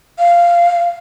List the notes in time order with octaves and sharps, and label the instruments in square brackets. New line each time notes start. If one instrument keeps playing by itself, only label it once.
[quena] F5